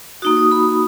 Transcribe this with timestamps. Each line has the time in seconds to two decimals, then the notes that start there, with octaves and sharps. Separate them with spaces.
0.22 A#3 D#4 F#4 D#6
0.37 D#6
0.52 B5